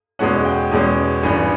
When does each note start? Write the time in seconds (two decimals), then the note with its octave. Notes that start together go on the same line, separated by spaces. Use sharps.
0.19 E2 B2 G#3 C#4 F#5
0.45 G5
0.71 E2 B2 G#3 C#4
1.23 G#1 G2 E3 G#5